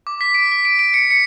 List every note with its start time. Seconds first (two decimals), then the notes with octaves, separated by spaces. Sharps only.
0.07 D6
0.21 B6
0.34 D7
0.52 B6
0.65 D7
0.79 D7
0.94 C#7
1.10 C#7